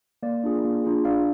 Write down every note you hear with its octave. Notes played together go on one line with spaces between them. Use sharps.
A#3 D5
D4 F4 G#4
A#3
D4 F4 G#4
D4 D5 F5